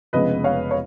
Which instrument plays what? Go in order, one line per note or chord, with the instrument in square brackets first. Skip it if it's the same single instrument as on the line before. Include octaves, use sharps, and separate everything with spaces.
[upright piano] F1 F2 C#3 G#3 B3 B4 D#5
C#5 F5
C#5